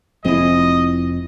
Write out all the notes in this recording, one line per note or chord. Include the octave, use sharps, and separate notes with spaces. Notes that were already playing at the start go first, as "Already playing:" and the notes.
F1 F3 C4 E4 G#4 D#5